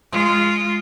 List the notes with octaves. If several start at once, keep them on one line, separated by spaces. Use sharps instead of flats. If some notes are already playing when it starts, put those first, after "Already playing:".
G#3 F4